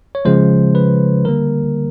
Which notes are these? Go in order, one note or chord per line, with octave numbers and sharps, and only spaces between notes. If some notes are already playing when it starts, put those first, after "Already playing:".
C#5
C#3 F3 G#3 C5
B4
D3 G3 A#3 A#4